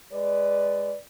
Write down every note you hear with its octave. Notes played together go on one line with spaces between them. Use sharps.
G#3 B4 D5